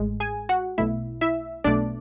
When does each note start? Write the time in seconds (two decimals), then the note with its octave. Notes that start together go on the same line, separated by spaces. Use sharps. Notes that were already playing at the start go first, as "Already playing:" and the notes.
Already playing: A1 A2 G#3
0.20 G#4 G#5
0.49 F#4 F#5
0.78 B1 B2 A3 E4 E5
1.21 E4 E5
1.64 B1 B2 A3 D4 D5